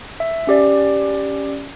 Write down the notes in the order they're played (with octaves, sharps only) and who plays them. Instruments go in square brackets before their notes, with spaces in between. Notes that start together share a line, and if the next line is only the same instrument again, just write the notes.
[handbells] E5
C#4 G4 D5